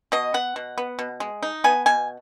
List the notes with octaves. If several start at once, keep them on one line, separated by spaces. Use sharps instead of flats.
B2 D#5
B3 F#5
B2
B3
B2
G#3
D#4
B3 G#5
B2 G#5